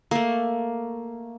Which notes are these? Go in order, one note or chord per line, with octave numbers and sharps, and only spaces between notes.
A3 A#3